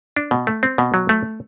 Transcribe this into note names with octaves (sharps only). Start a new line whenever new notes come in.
D4
B2
A3
C4
B2
F#3
A3